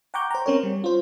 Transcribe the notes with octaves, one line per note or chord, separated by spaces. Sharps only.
F#5 G5 A#5 C#6 D6 G6
C5 A#5
C4 C#4 A#4 C#5
G3
F4 C5